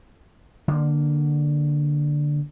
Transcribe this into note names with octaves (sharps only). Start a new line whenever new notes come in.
D3 A#3